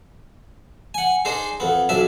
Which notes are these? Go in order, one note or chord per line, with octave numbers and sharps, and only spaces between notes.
F#5 G#5
D4 D#4 G#4 C5
F2 B3
B1 F2 D4 E5